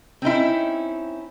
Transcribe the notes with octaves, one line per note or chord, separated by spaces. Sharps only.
C4 C#4 D#4 E4